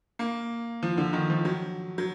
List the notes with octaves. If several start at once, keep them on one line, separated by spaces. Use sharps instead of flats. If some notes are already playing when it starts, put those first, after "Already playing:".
A#3
F3
D3
D#3
F3
F#3
F#3